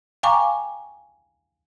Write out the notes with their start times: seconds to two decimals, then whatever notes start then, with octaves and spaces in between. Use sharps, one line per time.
0.23 F5 G5 G#5 A#5 C#6 D6